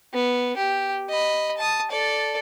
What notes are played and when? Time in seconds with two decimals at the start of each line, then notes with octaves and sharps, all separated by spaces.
0.13 B3
0.56 G4
1.09 D#5 B5
1.58 A5 D#6
1.91 A4 D5